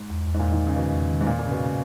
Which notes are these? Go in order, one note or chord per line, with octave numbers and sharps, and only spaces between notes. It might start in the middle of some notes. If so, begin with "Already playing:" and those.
Already playing: G#2
E2
E2
G#2
A#2
E2
D#3
E2
C#3
B2 D#3
E2
D#3
G#2
A#2 A#3
A#2
G#2 C#3
B2
C#3